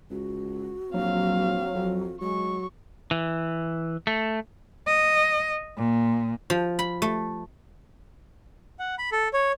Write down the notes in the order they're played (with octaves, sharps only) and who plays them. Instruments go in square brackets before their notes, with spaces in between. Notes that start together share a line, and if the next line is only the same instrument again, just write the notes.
[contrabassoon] C#2 [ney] F#4
[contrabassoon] A#1 [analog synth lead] F#3 [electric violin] C4 F5
[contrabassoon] F2
[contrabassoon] F#3 [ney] G#3 [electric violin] C#6
[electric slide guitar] E3
A3
[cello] D#5
A#2
[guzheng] F3
B5
A3
[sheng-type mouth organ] F#5
B5
A4
C#5